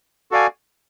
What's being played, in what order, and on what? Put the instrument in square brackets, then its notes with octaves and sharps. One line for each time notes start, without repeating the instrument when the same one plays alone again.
[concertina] F#4 A4 D5 F5 G#5